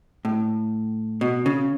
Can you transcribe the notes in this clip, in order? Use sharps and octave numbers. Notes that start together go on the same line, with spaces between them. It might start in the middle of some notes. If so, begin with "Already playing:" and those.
A2
B2
C#3